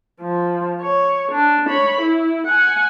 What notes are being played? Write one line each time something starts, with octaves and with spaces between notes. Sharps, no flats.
F3
C#5
D4
C#5 B5
E4
F#5 G#5